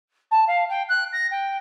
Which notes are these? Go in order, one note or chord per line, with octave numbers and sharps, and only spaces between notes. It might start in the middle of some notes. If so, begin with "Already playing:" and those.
A5
F5
G5
F#6
A#6
G5